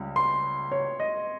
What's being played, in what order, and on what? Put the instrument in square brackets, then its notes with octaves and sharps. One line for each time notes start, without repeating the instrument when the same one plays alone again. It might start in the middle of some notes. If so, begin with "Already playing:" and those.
Already playing: [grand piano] C#2 C#3 G3
[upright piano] C6
C#5
D#5